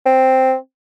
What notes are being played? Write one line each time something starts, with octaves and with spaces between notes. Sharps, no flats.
C4